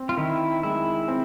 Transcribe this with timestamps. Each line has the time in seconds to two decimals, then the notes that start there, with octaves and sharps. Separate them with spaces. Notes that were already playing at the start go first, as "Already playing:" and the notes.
Already playing: C4
0.09 F4
0.17 D#3 E4
0.63 G#3 E4
1.08 C4